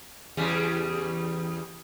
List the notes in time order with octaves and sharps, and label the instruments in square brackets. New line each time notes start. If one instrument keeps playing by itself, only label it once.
[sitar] E2 C#3 G3